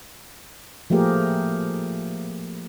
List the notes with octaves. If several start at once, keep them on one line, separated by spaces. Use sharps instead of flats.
F3 A3 A#3 G4 G#4 A#4